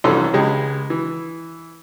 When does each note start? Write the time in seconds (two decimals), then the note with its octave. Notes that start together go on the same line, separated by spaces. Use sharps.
0.04 C2 F2 E3 C#4 A4 C6
0.33 C#2 G#3 G4
0.90 E3